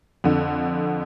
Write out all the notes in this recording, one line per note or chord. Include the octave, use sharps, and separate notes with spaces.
F2 D3